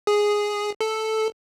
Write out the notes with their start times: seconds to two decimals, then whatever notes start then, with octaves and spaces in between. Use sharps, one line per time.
0.07 G#4
0.81 A4